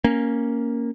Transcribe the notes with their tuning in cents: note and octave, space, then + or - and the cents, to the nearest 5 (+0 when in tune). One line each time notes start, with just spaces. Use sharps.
A#3 +0 C#4 +0